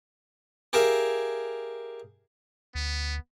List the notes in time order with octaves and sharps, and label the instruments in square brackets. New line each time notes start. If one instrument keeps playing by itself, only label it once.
[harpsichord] G4 G#4 A#4 E5 F5 G#5
[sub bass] D2 [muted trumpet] B3